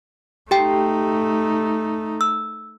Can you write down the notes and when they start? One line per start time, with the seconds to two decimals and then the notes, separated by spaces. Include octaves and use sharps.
0.51 A3 D#4 G4 G5
2.21 E6